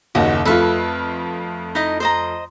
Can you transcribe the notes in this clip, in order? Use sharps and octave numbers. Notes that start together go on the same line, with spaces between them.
F#1 D#2 D#4 F#4
F2 A3 F4 A4 B4 E5
D#4 E4 D#5
C5 D#5 A#5